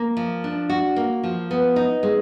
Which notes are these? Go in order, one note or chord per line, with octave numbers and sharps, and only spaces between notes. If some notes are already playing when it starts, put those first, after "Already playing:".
Already playing: A#3
F3
D4
F#4
A#3
F3
B3
D#4
G#3